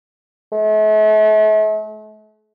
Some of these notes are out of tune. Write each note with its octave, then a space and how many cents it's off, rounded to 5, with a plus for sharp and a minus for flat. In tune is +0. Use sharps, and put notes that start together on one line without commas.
A3 -40